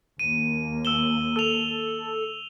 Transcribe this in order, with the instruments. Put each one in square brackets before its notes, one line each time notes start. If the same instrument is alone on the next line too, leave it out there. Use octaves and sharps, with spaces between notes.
[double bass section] D#2 A#3 [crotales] D#7
[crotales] E6 E7 G7
[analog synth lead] A4 [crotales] E6 F7